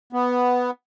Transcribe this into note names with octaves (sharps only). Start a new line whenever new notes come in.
B3